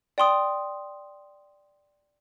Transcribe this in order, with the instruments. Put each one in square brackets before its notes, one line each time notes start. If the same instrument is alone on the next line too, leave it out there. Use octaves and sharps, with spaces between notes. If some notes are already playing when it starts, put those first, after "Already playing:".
[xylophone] D5 G5 C6 D#6